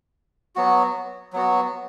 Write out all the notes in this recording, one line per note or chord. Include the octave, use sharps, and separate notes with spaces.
F#3 B3 F#4
F#3 B3 F#4